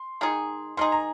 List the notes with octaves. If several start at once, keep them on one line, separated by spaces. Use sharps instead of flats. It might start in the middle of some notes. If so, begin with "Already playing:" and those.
Already playing: C6
D#3 G#3 D#4 G#4
D#3 G#3 D#4 G#4 C6
A#5